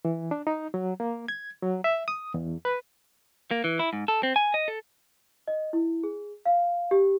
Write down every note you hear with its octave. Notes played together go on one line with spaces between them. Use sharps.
E3
D4
D#4
F#3
A#3
G#6
F#3
E5
D#6
E2
B4
A#3
E3
E4
G#2
A4
C4
G#5
D#5
A4
D#5
E4
G#4
F5
G4